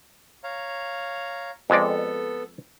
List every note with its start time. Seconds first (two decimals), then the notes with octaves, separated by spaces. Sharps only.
0.44 C#5 F5 A#5
1.70 F2 G#3 B3 A4 D5